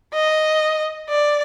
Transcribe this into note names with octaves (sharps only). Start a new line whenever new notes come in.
D#5
D5